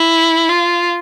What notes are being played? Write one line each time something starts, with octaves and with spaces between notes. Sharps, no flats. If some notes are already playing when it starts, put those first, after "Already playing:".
Already playing: E4
F4